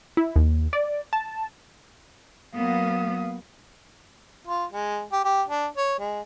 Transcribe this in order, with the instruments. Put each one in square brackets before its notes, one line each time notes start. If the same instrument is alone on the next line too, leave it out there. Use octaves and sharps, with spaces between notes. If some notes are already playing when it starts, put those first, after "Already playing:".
[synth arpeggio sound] E4
D#2
D5
A5
[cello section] F#3 A#3 B3 [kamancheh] F5 D#6
[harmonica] F4
G#3
G4
G4
D4
C#5
G#3